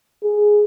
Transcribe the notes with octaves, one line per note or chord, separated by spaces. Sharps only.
G#4